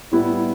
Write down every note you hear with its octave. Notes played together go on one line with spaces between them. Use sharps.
A2 G3 B3 E4